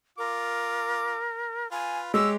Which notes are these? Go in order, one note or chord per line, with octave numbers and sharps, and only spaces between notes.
F4 A#4 D6
F4 B4 G#5
G#3 G4 C#5 E6